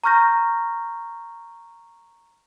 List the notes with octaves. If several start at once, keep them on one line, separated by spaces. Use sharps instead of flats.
A#5 C#6 F6 G6 A#6